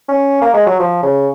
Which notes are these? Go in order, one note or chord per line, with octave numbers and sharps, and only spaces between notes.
C#4
A#3
G#3
F#3
F3
C#3